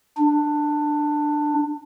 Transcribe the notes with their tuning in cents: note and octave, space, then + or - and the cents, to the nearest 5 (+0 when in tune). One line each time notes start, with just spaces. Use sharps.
D4 +15